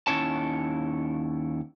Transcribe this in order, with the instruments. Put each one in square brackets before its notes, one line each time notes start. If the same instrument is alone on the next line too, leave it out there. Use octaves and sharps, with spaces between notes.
[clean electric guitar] D#2 E3 C#4 E4 C#5 A5